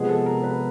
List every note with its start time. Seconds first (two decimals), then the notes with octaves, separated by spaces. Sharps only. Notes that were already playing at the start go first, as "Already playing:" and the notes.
Already playing: C3 F3 G#3 B3 G#4
0.09 A4
0.26 A#4
0.44 B4